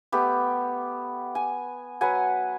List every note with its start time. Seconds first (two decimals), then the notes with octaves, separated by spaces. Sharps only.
0.12 A3 B3 G4
1.35 G#5
2.01 F#3 B4 F#5 G#5